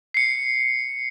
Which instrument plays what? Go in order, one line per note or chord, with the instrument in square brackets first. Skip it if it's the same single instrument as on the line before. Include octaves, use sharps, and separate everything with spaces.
[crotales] C7 C#7